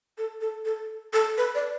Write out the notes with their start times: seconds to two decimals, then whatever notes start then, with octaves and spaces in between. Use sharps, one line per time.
0.18 A4
0.41 A4
0.65 A4
1.13 A4
1.38 B4
1.55 D5